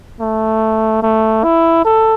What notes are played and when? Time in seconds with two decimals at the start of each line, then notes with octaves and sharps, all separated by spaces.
0.20 A3
1.03 A3
1.44 E4
1.85 A4